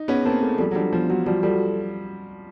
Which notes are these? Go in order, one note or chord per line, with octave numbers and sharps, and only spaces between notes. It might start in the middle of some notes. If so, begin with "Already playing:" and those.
Already playing: D#4
B3 C#4 G#4
A#3 C4 A5
A3 B3 G#4
F3 G3 A4
F#3
F3 G3 D4
F3 B3
F#3 F#4
F3 G3 F#4
F3 G3 A4